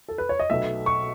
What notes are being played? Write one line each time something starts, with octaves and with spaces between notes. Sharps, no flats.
A4
B4
C#5
D#5
B1 B2 A3 E5
C#6